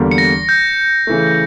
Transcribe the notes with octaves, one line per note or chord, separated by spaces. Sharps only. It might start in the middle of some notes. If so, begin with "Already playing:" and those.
Already playing: E2 D3 G3 A#3
C#7
A#6
G6
C#3 E3 A3